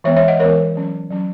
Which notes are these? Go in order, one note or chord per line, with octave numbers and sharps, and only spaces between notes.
E3 G#3 B3 C#5 E5
C#5 E5
D#5 F#5
E3 G#3 B3 A#4 C#5
F#3 C#4
F#3 C#4